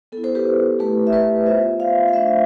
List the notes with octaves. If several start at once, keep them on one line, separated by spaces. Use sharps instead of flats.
B3 A4
E4
A4 C5
G4 B4
A3 E4 G4 B4
E5
B4 D5
B3 F4 C5 E5
D5 F5
F5
A3 D4 F4 C5 E5